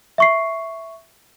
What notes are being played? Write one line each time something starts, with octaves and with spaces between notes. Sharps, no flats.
E5 C#6 C7